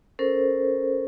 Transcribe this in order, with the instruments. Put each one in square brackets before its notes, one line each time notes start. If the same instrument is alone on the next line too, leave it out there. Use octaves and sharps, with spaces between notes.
[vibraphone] C#4 A4 A#4 C5